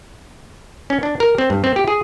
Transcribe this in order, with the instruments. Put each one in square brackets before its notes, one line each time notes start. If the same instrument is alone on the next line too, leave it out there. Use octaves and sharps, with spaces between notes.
[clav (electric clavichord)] C#4
D4
A#4
C4
G2
C4
G4
G#4